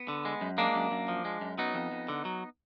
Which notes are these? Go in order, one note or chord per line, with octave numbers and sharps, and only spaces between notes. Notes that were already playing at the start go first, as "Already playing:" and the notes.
Already playing: B3
D3
G#3
F#2
G#3 A#3 D4
F#2
F#2
F3
G#3
F#2
F#3 B3 D#4
F2
F2
D3
F#3